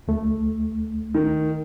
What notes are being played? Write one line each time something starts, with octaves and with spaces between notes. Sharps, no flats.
D2 A3
D#3